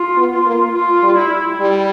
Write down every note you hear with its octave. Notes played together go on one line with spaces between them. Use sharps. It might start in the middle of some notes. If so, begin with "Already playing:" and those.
Already playing: F4
B3
F4
A#3
F4
G3
E4
G3